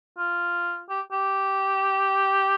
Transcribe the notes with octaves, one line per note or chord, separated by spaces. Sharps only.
F4
G4
G4